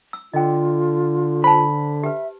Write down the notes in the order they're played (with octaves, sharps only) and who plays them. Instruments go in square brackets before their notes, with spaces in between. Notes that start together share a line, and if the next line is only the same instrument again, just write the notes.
[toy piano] E6
[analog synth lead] D3 [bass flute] F4 [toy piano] D#5 G5
[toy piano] C5 A5 [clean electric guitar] B5
[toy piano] G4 B4 [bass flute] E5